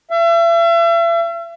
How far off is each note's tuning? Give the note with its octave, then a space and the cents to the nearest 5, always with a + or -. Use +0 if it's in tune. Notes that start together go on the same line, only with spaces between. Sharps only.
E5 +40